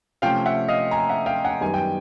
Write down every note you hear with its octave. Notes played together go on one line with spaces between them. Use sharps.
C3 F3 A3 C#4 F5 G5
E5 F#5
D#5 F5
G#5 A#5
E5 F#5
F5 G5
F#5 G#5
F#2 D#3 G3 B3 G#5
G5